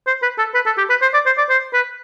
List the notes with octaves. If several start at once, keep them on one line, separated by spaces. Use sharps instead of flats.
C5
B4
A4
B4
A4
G4
B4
C5
D5
C5
D5
C5
B4